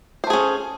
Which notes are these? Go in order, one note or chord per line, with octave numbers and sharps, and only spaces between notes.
A3 C#4 G#4 C5